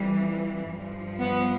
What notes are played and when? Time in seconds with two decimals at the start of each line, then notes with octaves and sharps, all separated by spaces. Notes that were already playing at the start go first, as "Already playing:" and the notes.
Already playing: F2 E3 G3
0.73 G2 F3
1.20 B3